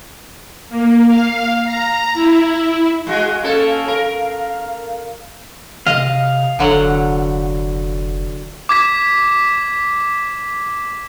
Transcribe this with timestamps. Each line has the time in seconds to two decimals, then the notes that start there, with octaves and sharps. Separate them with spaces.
0.69 A#3
1.06 F5
1.64 A#5
2.14 E4
3.07 G#3 F#4 G#4 F5
3.42 A#3 C#4 A4
3.88 A#4
5.87 C3 D#5 F5
6.59 F1 D3 F#3 F#5
8.69 D6 G#6 B6 E7